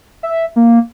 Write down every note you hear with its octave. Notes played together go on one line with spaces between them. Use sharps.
E5
A#3